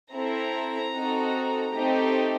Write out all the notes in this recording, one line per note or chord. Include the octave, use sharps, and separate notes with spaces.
C4 E4 A4 A#5
C4 D#4 F#4 A4
A3 C4 D#4 G4